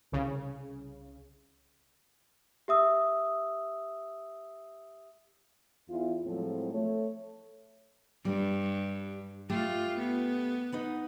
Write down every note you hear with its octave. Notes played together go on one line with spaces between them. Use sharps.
C2 C#3
G4 E5 D#6 E6
E2 E4 F4
A2 F3 F#3 G#3 C4 A4
A3 C#5
G2 G3
A3 F4 G4
B3
D#4 B4 F#5